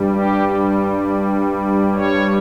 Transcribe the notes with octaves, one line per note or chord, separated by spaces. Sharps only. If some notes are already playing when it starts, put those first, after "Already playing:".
Already playing: G2 G3
G4
C#5